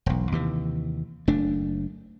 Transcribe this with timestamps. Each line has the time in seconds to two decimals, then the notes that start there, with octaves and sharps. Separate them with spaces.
0.06 E1 B1
0.32 D#2 C3 E3
1.28 F#1 A3 D4